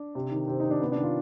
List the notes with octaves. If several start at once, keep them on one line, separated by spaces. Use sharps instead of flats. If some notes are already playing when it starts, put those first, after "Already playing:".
Already playing: D4
C3
D#3
C3 C4
D#4
D#3
D4
C3 B3
D4
D#3
F4